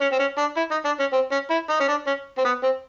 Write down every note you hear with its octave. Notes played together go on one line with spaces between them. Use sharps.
C#4
C4
C#4
D4
E4
D#4
D4
C#4
C4
C#4
E4
D#4
C#4
D4
C#4
C4
B3
C4